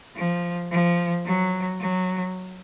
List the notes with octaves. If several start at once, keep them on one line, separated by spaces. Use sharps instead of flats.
F3
F3
F#3
F#3